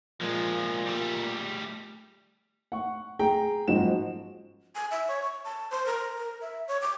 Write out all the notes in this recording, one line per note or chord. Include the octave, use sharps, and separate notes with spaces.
A#2 F3 G#3
G3 A3
F#5 C#6
G#4 G5 A#5
F#1 G#2 F3 F#4 E7
G#5
E5
C#5
C#6
A5
C5
A#4
A#4
E5
C#5
D6